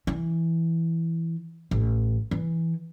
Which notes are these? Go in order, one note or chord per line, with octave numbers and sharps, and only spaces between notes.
E3
A1
E3